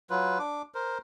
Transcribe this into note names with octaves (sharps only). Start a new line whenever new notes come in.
F#3 F4 B4
D4 D6
A#4 C5